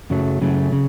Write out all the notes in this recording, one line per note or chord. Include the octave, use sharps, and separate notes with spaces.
F#2 C#3 F#3 A3
F#2 C#3 F#3 A3
C#3